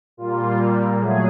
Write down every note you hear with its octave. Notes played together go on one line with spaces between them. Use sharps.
A#2 G3 A#3 F4
A#2 F#3 A3 G#4